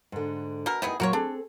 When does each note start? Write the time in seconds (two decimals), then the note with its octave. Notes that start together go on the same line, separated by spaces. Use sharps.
0.12 G#2 D3
0.66 B2 A#4
0.82 D#3 B3 E4 G#4 D#5
1.00 A#2 F#3 F#4 A#4 C#5
1.13 C4 D4 G#4 A4